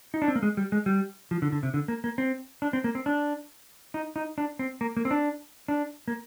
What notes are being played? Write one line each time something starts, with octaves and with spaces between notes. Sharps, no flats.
D#4
D4
C4
A#3
G#3
G3
G#3
G3
F3
D3
D3
C3
D3
A#3
A#3
C4
D4
C4
A#3
C4
D4
D#4
D#4
D4
C4
A#3
A#3
C4
D4
D4
A#3